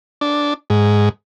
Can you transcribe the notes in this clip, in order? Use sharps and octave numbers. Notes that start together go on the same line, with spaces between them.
D4
G#2